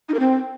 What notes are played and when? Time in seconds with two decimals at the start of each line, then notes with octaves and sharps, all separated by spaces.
0.09 D#4
0.14 A#4
0.20 C4